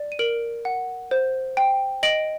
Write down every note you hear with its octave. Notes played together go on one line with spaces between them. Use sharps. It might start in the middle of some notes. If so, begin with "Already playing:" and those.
Already playing: D5
D#7
A#4 D7 F#7
F#5
C5
G5
D#5 D7 F#7